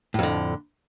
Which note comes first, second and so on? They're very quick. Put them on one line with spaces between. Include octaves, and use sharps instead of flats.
A2 F2 D3